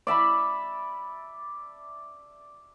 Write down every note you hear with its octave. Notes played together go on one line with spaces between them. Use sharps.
D5 E5 A5 B5